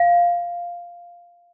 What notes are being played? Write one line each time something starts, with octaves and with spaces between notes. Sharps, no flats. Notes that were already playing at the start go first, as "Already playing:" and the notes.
Already playing: F5